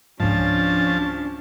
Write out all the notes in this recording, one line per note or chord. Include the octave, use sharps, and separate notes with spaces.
C#2 G#2 F3 C#4 D4 A5